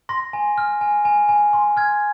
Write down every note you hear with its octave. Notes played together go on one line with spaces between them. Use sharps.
C6 A#6
G#5
F6
G#5
G#5
G#5
C6
F6 G#6